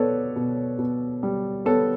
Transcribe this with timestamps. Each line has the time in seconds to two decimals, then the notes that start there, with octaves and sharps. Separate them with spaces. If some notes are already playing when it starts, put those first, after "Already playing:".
Already playing: B2 B3 A4 B4 C#5 D5
0.36 B2
0.79 B2
1.23 G3
1.65 B3 A4 C#5